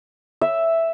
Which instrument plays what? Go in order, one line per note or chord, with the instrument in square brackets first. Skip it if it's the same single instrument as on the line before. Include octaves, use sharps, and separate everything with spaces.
[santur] E5